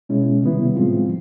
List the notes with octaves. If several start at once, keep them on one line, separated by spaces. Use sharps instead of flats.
B2 G#3 C#4 E4
C3 D#3 G3 B3 E4
A2 F3 G#3 C4 F4